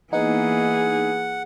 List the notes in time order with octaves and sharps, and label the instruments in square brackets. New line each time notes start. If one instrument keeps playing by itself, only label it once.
[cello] E3 A#3 [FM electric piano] B3 D#4 [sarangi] G#4 [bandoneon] F#5